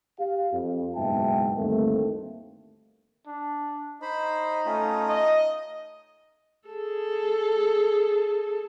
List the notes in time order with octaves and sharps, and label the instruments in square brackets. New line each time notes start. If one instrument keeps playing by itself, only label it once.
[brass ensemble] G4 F5
F2
F#1 G#2 B2 E5 G5 A5
D2 G2 D#3 A3 A#3 C4
[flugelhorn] D4
[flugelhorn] D#4 [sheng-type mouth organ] C5 B5
[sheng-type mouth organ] A3 C#4 F4
[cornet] D#5
[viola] G#4 A4